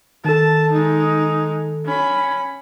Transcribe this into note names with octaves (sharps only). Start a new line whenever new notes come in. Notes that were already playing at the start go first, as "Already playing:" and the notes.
D#3 A4 A5
G#3 D#4
C#4 B5